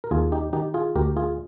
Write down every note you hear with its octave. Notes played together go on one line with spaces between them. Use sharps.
A#4
D#2 F4 G#4
D#4 G4
D#3 D#4 G4
F4 G#4
D2 G4 A#4
F4 G#4